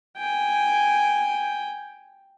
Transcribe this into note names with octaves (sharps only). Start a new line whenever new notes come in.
G5 G#5